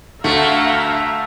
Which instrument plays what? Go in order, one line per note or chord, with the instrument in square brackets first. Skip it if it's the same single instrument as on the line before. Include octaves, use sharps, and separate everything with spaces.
[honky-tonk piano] D2 [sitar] A3 [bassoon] F#4 [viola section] E5 F5 A#5